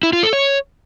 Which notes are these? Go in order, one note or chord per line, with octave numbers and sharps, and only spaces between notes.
E4
F4
A4
C#5